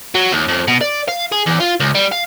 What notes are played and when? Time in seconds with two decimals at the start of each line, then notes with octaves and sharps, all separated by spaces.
0.15 F#3
0.32 D#2
0.48 F2
0.68 B2
0.81 D5
1.08 F5
1.32 G#4
1.47 E2
1.60 F4
1.80 C#2
1.95 G3
2.12 F5